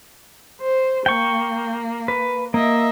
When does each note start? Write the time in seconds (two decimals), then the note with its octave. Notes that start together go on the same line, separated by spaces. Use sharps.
0.61 C5
1.06 A#3 G5 C#6
2.08 B4
2.54 A#3 D#5 E5